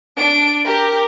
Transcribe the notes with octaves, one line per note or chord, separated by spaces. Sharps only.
D4 D7
G4 A#4